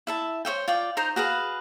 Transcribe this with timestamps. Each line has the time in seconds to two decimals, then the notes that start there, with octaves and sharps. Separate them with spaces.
0.07 E4 E5 A5
0.45 C5 C#5 E5 G5
0.68 F4 D5 G5
0.97 D#4 C5 A#5 C6
1.16 F#4 G#4 B4 F5